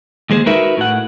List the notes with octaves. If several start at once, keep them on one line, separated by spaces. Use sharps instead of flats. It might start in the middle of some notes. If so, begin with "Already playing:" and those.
D#2 G#3 G#4 C5
D#4 F#4 A#4 B4 E5
A2 F#5